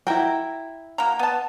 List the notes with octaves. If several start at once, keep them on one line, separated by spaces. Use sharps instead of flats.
E4 F#4 A#4 G5
A#3 F#4 A#5
B3 A5